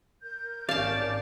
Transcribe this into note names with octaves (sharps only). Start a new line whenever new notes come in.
A#4 G6
G#1 C#4 D5 F5 A5